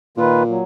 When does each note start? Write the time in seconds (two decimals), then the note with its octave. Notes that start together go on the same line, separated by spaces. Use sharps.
0.17 A#2 D#3 A#3 F4 B4
0.49 F#3